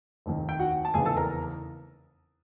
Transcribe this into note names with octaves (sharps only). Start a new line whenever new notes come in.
F1 D#2 D#3
G5
F#4 F#5
A5
F1 E2 C#3 E3 G#4 G#5
A4 A5
A#4 A#5